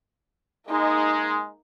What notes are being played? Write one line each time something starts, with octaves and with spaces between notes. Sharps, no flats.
G#3 A#3 D#4